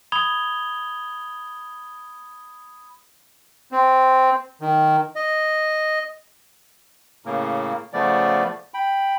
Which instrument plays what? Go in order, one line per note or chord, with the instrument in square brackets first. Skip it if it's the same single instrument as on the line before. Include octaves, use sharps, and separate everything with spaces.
[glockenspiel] B5 D#6 G#6 F7 G7
[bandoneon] C4
D#3
D#5
A2 C#3 A#3
C#3 F3 A3 B3 D5
G5 B5